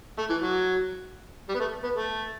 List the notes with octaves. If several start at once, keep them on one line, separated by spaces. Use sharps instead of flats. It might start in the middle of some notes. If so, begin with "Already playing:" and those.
A3
E3
F#3
G3
B3
A3
B3
A3